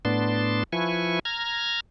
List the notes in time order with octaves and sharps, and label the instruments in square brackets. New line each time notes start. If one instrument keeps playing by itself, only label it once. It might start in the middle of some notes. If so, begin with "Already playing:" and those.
[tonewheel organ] A2 B3 D4 A5 C6
F3 E4 B4 G#5 C#6
A#5 F6 G#6